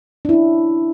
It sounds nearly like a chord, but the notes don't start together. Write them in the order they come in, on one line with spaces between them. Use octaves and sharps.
D4 E4 C#4